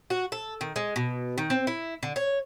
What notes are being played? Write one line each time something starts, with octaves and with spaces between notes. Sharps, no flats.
F#4
A4
D#3
G#3
B2
D#3
C4
E4
D3
C#5